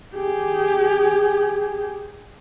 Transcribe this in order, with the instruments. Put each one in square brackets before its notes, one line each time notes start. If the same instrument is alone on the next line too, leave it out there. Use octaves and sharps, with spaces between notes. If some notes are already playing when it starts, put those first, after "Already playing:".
[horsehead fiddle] G4 G#4